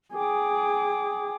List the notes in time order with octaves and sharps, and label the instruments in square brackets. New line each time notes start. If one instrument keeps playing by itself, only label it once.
[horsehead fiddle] G#4 [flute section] G5 D6 D#6